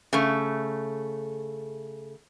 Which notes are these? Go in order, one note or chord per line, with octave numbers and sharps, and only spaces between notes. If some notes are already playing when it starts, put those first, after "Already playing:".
C#3 A3